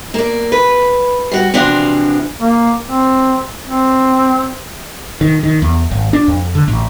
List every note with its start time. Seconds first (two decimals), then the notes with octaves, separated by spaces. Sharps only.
0.14 A#3 D5
0.52 B4
1.32 G3 F#4
1.54 C3 E3 F3 D4 F#4 F5
2.41 A#3
2.87 C4
3.67 C4
5.21 D#3
5.43 D#3
5.62 E2
5.91 G#1
6.13 D4
6.28 F2
6.55 D3
6.68 A1